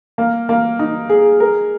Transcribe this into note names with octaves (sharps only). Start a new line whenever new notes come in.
A#3
A#3
D#4
G#4
A#4